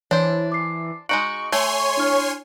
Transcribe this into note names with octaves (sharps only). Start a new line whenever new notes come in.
E3 D4 C5 C#5
D6 C7
G#3 D#4 F#4 C#6 C#7 D7 F#7
A3 C#5 G#5 C6
D4 E4 F6